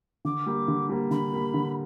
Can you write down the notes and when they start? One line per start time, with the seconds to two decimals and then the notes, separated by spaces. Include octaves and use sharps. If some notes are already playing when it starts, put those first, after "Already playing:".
0.25 D3 D6
0.46 G3 A#3
0.68 D3
0.89 G3 A#3
1.11 D3 B5
1.33 G3 A#3
1.54 D3